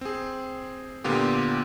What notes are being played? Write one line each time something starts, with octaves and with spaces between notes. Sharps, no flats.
C4 G#4
A#2 D3 B3 F4 G4